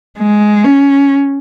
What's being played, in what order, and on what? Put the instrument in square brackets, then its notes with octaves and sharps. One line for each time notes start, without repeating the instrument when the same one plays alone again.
[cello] G#3
C#4